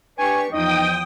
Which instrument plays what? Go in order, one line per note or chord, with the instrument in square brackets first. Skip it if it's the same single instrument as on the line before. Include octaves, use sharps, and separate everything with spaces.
[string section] D4 G4 C#6 [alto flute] B4 [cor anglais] G#5
[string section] E2 F3 [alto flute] D#4 [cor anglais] D#5 [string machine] G5 D#6